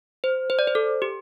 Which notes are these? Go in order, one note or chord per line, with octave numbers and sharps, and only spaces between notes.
C5
C5
D5
C5
A4
G4